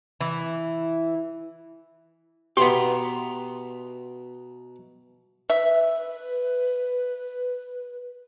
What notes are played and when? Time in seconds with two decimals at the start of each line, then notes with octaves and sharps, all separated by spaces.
0.21 E3
2.57 B2 B3 G4 E5 A#5 C6
5.50 B4 E5